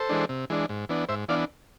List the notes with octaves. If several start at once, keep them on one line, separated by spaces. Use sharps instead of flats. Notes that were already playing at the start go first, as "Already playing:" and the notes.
Already playing: A4 C5
E3 G#3 D4
C3
E3 G#3 D4
G#2
E3 B3 D4
G#2 C5 E5
E3 B3 D4 D5 F5